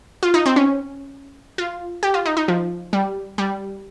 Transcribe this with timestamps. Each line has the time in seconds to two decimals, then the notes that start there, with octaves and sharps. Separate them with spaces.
0.23 F4
0.34 D#4
0.46 C4
0.56 C#4
1.58 F4
2.03 G4
2.14 F4
2.26 D#4
2.37 D#4
2.48 F3
2.93 G3
3.38 G3